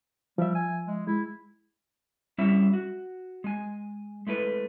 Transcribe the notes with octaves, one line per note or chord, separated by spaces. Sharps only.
F3 G3 E5
G#5
G#3
G#3 E4
G3 C#4 E4 E5
F#4
G#3 G#5
G#3 A3 E4 B4